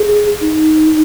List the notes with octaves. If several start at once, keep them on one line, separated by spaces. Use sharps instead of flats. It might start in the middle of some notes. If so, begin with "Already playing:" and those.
Already playing: G#4
D#4